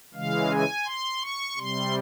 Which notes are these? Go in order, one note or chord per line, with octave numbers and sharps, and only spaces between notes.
C#3 E3 G#3 F5
G#5
C6
C#6
C3 G3 C6